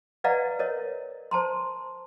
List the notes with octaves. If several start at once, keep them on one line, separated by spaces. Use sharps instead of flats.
B4 D5 D#5 F5 F#5 A#5
A#4 C#5 D#5
C5 A5 A#5 C6